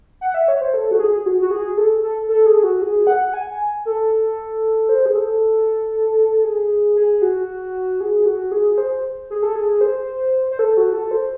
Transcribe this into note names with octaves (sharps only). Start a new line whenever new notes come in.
F#5
E5
C#5
C5
A4
F#4
G#4
F#4
F#4
G#4
A4
A4
A4
G#4
F#4
G#4
F#5
G#5
A4
C5
G#4
A4
G#4
G#4
F#4
G#4
F#4
G#4
C5
G#4
A4
G#4
C5
C5
A4
F#4
A4
C5